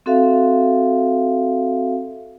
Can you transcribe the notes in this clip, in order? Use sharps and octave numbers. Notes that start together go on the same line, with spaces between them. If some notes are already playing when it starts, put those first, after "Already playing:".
C4 F#4 A4 E5 F5